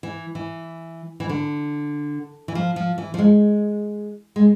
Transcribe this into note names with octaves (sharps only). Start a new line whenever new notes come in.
E3
E3
E3
D3
E3
F3
F3
E3
F3
G#3
G#3